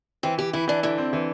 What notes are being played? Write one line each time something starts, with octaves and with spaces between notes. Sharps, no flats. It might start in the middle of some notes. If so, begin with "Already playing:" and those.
E3 C4
E3 G4
E3 E4
E3 D4
D3 E4
C4
E3